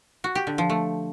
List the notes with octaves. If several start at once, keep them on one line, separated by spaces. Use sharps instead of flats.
F#4
G4
D3
F3
A3